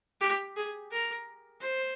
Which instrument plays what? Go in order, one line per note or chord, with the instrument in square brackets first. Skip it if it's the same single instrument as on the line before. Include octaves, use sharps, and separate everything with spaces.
[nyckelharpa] G4
G#4
A#4
C5